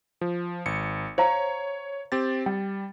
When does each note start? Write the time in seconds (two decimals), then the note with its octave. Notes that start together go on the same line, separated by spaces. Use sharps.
0.21 F3
0.66 G#1 C#7
1.18 C5 C#5 F5 A#5
2.12 C4 G4 A6
2.46 G3 G5